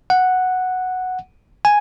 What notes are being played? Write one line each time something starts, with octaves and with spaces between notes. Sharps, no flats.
F#5
G#5